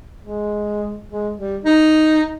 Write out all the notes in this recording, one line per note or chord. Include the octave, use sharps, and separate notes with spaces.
G#3
G#3
G3
D#4